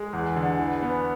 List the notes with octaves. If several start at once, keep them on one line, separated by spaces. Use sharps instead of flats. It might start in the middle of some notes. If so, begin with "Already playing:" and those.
Already playing: G#3
E2
D3
E3
B3